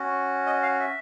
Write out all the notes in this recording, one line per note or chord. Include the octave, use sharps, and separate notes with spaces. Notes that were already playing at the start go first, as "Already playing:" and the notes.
Already playing: C#4 F#4
D#5
F5
E5